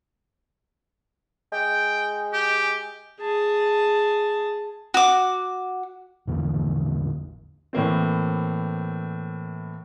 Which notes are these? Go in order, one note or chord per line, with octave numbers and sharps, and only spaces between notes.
G#3 G5
G4
G#4 A5
F#4 D6
A1 E2 D3 A#3
A2 E3 A#3 C4